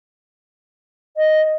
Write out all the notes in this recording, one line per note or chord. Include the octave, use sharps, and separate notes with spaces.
D#5